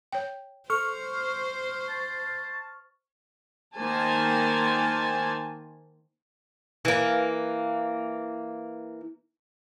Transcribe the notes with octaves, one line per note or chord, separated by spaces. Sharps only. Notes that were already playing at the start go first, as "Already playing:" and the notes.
C#5 G5
A4 C5 C#6 F6
A5
D#3 A#3 C5 G#5 A5
E3 A#3